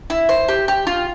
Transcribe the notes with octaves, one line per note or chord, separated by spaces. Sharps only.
E4
C5
G4
G4
F4